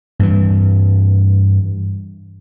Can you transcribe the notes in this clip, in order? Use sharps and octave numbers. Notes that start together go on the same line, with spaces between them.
G2 E3